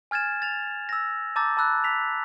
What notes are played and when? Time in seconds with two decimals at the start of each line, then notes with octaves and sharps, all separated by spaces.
0.11 G#5 F6 G#6 A6 E7
0.42 A6 F7
0.89 E6 A#6
1.36 A5 A#5 D6 E6 G6 A6
1.57 A5 B5 E6 F#6
1.84 B6 F7